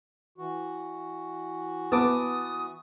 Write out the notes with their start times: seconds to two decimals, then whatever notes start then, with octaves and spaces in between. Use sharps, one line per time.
0.38 E3 F#4
1.92 B3 A5 D6 D#6